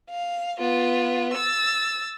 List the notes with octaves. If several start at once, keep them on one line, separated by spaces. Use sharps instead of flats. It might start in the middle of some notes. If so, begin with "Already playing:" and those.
F5
B3 F4
E6 A6